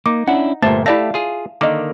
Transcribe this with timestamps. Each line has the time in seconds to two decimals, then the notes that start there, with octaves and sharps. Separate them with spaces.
0.06 A#3 D#4 D6
0.28 C#4 D4 E4 F#5
0.62 G1 A#2 A3 C5 E5 A5 A6
0.86 A3 E4 G4 D5 E5 F5 A5 A#6
1.14 F4 G#4
1.61 D3 D#3 A#3 D#5 D6